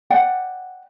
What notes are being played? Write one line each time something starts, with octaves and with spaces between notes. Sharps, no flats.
D5 F#5 G5